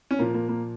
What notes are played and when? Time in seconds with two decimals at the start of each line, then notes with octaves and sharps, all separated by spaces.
0.11 C#4
0.19 A#2 F3 A#3
0.34 A#3
0.49 A#3